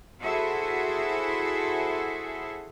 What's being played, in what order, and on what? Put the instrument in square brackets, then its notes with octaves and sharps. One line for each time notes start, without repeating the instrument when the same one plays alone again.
[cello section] E4 F#4 G#4 A4 C5 E5